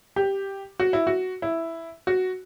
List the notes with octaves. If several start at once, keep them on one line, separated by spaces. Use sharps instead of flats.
G4
F#4
E4
F#4
E4
F#4